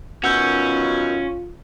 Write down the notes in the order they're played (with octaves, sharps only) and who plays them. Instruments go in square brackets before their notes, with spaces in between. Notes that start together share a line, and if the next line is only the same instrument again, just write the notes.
[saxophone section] F#2 B2 D#3 [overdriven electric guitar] C#4 [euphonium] F4 [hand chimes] F#5 E6 G6